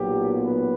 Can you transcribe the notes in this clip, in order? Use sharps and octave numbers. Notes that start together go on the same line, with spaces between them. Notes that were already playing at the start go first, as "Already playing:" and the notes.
Already playing: B1 A#2 F#3 B3 G4
B4